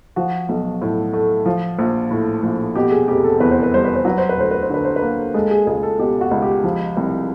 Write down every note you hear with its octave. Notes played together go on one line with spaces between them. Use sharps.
F3 F#4
B1
A2
A3
F3
A#1
A2
A#1
B2 G4
G#4
F1 G4
A4
E2 B4
C5
B4
G3 C5
B4
C5
F#3 B4
C5
B4
D2 C5
B4
C5
D3 B4
C5
B4
A#3
G#3 A4
G#4
C#2 G#4
A4
B2 G4
F#4
C#2
G4
F3
C2